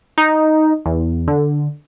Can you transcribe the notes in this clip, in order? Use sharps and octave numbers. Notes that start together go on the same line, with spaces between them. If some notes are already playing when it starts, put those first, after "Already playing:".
D#4
E2
D3